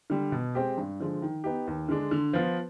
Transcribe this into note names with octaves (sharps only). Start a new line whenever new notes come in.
D3 G3
B2
G#3 C4 G4
G2
D3 F3 G#3
D#3
B3 D#4 G4
D#2
D3 G#3 D4
D3
F3 B3 F4